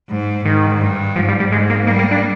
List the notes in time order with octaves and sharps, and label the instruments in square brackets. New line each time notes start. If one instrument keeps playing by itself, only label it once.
[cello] G#2
[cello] G#2 [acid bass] D#3
[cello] G2
[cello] G#2 [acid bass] F3
[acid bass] G3
G3
[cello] G#2 [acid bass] G#3
[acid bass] A#3
[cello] G3 [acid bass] A#3
[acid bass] A#3
D4